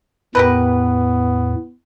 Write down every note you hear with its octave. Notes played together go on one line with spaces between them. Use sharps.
E2 A2 B3 G4 A#4 B4